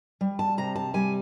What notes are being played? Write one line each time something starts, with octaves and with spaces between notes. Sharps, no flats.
G3
A5
C3 A#5
A5
G3 G#5